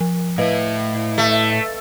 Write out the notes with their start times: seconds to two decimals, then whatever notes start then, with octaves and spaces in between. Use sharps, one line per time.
0.01 F3
0.38 A2 E4 B4 D#5 F5
1.18 A3